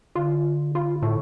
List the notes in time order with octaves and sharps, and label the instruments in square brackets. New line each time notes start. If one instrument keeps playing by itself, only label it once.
[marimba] D3 [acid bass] F4
[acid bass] F4 [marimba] B5
[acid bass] A2 [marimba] C#6